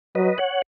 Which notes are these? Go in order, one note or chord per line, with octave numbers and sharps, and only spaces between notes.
F#3 B4 D#5
C#5 F#5